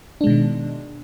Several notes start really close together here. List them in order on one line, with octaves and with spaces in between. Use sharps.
D4 G#3 B2 D#3